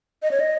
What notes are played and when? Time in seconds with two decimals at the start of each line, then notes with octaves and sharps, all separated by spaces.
0.22 D#5
0.31 C#5
0.40 D#5